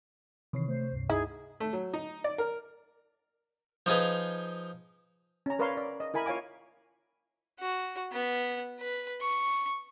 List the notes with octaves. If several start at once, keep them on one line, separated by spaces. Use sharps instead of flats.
C3 D#3 E3 C#5 C7
A3 C5
C#2 G2
D#4 E4 G#4
A3
F#3
D#4
D5
A#4
F3 D#4 F4 G#4 B4
C#4 A#5
A#4 B4 C#5 D5 F5 C6
D5
D#5
E4 A#4 G#5 B5
F4 C#5 F5 G#5 D6
F#4
B3
B4
C#6